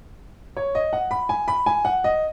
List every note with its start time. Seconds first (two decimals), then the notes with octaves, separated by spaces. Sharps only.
0.57 C#5
0.75 D#5
0.93 F#5
1.11 B5
1.29 G#5
1.48 B5
1.66 G#5
1.85 F#5
2.04 D#5